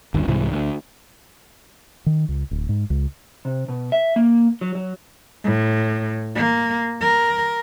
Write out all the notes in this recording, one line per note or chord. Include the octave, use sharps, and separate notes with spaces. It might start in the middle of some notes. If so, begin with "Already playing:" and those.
G1 D#2
C2 G#2 C3 E3
D2
D#3
C#2
D1
G#2
C#2
C3
B2
E5
A#3
F#3
F#3
A2
A#3
A#4